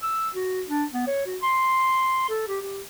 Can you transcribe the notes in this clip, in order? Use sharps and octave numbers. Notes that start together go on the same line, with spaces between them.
E6
F#4
D4
B3
C#5
F#4
C6
A4
G4
G4